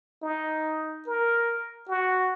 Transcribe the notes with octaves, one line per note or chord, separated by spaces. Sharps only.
D#4
A#4
F#4